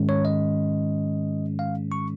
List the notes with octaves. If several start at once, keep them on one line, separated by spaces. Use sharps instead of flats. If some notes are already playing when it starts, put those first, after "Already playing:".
Already playing: G#2 D#3 G#3 C#4
C#5
D#5
F5
C#6